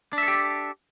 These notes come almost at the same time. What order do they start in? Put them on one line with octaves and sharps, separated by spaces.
D4 E5 A4 G4